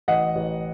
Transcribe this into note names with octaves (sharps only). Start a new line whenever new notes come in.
A1 D#5 F#5
A1